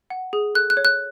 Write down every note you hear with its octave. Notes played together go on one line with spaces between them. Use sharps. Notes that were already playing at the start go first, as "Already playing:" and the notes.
F#5
G#4
A4 F#6
F#6
C#5
F#6